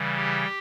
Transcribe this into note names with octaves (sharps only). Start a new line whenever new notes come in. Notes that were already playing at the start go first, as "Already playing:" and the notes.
Already playing: C#3 E3 G3
G4